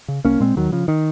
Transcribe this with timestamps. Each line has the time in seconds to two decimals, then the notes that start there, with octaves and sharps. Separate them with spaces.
0.08 C#3
0.25 C2 A#3 C#4
0.41 A#2 G#3 C4
0.56 D#2 D#3 F#3
0.72 C#3 F3
0.88 D#3